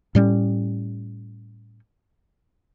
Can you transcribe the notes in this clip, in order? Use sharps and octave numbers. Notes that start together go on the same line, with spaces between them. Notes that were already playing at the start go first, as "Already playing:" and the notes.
A2 G3 C#4